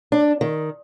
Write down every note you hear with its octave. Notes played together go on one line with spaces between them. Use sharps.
D4
D#3